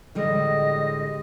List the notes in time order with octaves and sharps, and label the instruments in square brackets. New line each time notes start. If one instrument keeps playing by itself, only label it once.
[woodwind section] A2 D#5 [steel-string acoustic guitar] D3 G3 G#3